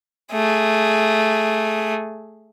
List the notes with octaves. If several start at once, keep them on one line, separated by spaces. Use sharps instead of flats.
A3 G#4